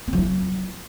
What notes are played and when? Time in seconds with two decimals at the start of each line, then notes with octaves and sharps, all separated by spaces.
0.08 C4
0.13 F3
0.18 E4
0.23 F#3